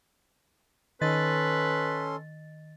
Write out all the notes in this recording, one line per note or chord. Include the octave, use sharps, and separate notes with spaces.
D#3 C#4 A4 B4 D#5 C6 A6